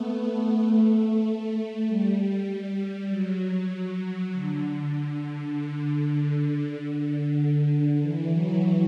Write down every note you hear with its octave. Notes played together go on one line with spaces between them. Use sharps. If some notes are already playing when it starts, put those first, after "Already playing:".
Already playing: A3 B3
A3
G3
F#3
D3
D3
D3
E3
F#3